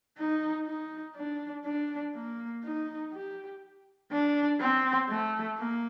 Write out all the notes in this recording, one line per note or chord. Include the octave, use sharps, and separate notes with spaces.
D#4
D#4
D4
D4
A#3
D#4
G4
D4
C4
A3
A#3